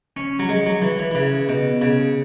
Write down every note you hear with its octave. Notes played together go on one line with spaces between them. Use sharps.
C#4
F#3
G#3
F#3
E3
E3
E3
C#3
B2
C#3